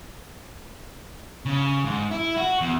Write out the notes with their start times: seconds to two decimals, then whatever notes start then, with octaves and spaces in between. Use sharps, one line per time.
1.45 C#3
1.85 G#2
2.11 E4
2.37 F#4
2.60 E2